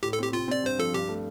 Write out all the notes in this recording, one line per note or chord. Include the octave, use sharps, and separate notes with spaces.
A2 G4
A4
C4 G4
C3 F4
C4 D5
G2 C5
F3 A4
G2 G4
A3